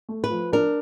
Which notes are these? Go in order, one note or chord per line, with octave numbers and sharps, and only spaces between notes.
A3
B4
F3
D4 A#4